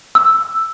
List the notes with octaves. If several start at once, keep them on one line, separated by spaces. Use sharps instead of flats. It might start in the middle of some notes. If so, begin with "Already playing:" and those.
E6